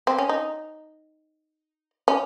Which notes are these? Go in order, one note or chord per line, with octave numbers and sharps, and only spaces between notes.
C4
C#4
D#4
C#4